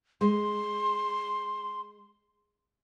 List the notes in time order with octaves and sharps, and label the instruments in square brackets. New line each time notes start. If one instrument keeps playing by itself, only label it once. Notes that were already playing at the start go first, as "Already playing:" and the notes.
[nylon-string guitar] G#3 [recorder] C6